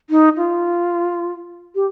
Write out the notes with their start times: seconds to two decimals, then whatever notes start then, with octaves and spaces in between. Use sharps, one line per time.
0.10 D#4
0.37 F4
1.75 G4